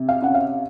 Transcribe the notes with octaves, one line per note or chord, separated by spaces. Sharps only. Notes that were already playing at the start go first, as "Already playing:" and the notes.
Already playing: C3
F5
C#4 F#5
F5